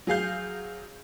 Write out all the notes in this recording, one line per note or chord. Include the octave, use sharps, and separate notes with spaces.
F#3 G#4 F5 G6